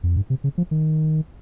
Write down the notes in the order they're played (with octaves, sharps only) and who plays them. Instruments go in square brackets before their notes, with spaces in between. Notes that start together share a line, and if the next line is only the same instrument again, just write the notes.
[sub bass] F2
G2
C3
C#3
F3
D#3